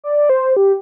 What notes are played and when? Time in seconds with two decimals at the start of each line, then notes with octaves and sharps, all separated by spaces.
0.04 D5
0.29 C5
0.57 G4